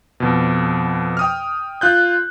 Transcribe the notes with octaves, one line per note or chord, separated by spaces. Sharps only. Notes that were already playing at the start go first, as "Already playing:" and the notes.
F2 B2
G5 D#6 F6
F4 F#6 G6